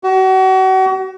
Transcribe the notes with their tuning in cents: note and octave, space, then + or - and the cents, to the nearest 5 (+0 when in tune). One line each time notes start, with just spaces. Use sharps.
F#4 +35